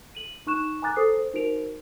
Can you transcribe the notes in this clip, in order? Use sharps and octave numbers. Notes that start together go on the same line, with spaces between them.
D#7 F#7
D#4 C#6 F#6 E7
G#5 A#5 D6 F#6 A6
A4 C5 D#6 C7
C5
D#4 F#4 A#4 C5 D7 F7